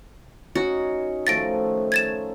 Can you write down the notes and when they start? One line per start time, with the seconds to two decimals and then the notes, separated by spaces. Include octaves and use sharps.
0.55 C#4 D#4 F#4
1.27 D#3 F3 A3 A6 A#6 D7
1.92 G#6 A6 E7